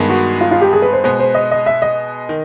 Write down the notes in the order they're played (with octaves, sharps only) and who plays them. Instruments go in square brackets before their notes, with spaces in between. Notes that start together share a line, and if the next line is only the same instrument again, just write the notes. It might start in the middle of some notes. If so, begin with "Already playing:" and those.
Already playing: [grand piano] G2 D#3 G#3 B3
[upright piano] F#4
F4
F4
G4
G#4
B4
C5
[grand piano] B2 G#3 B3 [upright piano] C5
[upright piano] C5
D#5
D#5
E5
D#5
[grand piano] D#3